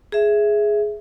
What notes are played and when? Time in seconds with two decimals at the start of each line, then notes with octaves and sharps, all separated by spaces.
0.12 G#4 E5